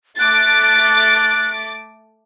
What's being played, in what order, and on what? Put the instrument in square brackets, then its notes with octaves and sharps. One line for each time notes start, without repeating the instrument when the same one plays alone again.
[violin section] A3 D6 A6 [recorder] F#6